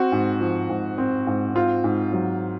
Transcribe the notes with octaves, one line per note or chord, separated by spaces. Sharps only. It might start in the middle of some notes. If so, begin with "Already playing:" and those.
Already playing: C4 F#4
G#2
F3
G#2
C4
G#2
C4 F4
G#2
F#3